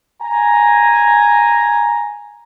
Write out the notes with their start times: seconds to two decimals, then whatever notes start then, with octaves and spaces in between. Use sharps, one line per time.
0.22 G#5 A#5